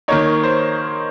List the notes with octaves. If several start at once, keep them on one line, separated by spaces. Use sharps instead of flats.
D#3 A#3 D#4 C#5
C5